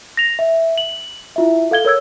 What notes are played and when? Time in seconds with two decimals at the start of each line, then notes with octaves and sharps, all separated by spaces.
0.17 A#6 F7
0.39 E5
0.78 F#7
1.36 E4 F4 E5
1.71 A4 F5 G#6 G7
1.85 A#4 C#5 E6 G#6